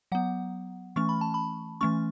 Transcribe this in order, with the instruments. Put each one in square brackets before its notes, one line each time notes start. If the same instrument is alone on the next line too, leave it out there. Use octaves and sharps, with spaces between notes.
[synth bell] F#3 B3 F#5
E3 A3 C#4 C#6
B5
A5
B5
E3 A3 C#4 C#6